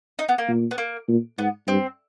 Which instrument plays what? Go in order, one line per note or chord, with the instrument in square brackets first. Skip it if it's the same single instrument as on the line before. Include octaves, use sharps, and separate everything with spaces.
[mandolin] D#4
B3
A#3
[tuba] A#2
[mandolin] B3
A#3
[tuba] A#2
[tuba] G#2 [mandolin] B3
[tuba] G2 [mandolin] C4